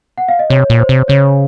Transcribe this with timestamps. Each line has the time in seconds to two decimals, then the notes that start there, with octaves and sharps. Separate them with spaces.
0.18 F#5
0.28 F5
0.39 D#5
0.50 C3 C#5
0.70 A#2
0.79 C5
0.89 C3
1.08 C#3 C#5